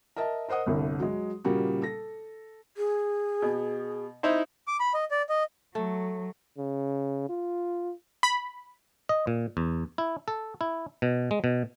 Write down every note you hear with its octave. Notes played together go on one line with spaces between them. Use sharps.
A#4 D#5 E5 A5
A#4 C5 D#5 F#5 D#6
G1 C2 D3
F#3 G#3
A#2 C#3 G3 A#3 F#4
A4 A#6
G#4
B2
D#4 E4 C5
D6
B5
D#5
D5
D#5
F#3 A3
C#3
F4
B5
D#5
A#2
E2
E4
A4
E4
B2
G#3
B2